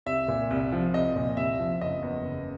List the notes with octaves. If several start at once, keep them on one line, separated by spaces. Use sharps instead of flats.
C2 E5
A#2
C2
F3
C2 D#5
A#2
C2 E5
F3
F#1 D#5
E2
F#1